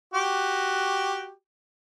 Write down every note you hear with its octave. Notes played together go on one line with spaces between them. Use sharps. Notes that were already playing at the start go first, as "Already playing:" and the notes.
F#4 G4